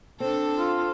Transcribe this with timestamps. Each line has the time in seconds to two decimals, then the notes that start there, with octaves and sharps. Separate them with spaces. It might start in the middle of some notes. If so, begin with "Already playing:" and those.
0.20 C4 D4 A4
0.57 F4